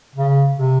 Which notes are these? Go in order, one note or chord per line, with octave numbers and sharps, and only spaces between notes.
C#3
C3